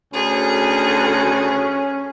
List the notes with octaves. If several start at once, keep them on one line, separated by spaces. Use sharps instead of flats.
D2 C#4 G#4